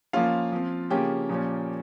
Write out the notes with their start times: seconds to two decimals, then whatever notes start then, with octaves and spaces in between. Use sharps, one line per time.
0.13 F3 A#3 C#4 F4 F5
0.52 F3 C4
0.90 C#3 F3 A#3 C#4 G4 G5
1.29 A#2 F3 A#3 C#4